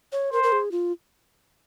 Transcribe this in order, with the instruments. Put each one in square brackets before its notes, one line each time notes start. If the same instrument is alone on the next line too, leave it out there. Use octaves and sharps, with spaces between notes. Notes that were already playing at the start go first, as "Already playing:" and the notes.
[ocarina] C#5
[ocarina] A#4 [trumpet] C5
[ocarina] A#4
G#4
F4